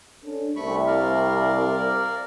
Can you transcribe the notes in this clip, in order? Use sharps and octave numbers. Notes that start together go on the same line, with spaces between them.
C#4 D4 A4
C2 A3 B5 C#6
A#4 D5 F5